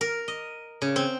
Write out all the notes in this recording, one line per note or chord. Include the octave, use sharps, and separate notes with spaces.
A#4
D#5
C#3
C4